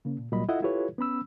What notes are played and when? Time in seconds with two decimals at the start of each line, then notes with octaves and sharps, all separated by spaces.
0.05 C#3 A#3 C#4
0.18 A#2
0.32 C2 A#2 F#3 G3 D#5 B5
0.49 E4 F4 A4 D#5 E5 F#5
0.62 E4 F4 G4 A4 B4 C#5
0.98 B3 C#4 B5 E6